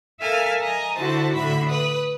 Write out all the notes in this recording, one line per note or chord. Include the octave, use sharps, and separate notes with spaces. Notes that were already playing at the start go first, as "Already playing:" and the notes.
A4 A#4 E5 F5 G#5 A5
D#5 G#5 A#5
D3 E4 F#4 C5 A5
A2 D3 E5 B5
B4 D#6